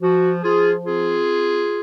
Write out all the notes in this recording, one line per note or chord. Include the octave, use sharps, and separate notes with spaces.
F3 F#4
F3 F4 G#4
C4 F4 G#4